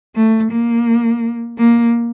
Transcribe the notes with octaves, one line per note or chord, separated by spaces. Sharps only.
A3
A#3
A#3